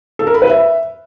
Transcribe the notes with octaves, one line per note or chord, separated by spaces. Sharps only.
A4
A#4
B5
B4
E5